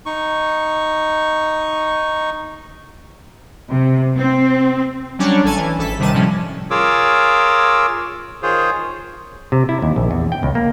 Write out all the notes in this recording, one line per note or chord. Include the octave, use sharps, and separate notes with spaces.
D#4 C#6
C3
C4
F#3 G3 C#4 D4 C#5
A1 A4 G#5 A5
E3
G#1 A4 B6
G1 C3 D#3 G3 A5 D#7
A2 C3 F3 G3 C#4
F4 G#4 A#4 C#5 D6 E6
D#3 F4 G#4 C5 C#5
C3
E4
D#2
A#1
E2
G5
C#2
A#3